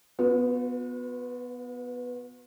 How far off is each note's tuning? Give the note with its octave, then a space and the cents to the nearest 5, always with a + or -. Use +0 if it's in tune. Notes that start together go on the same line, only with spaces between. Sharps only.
B3 +0 F#4 -45 B4 +35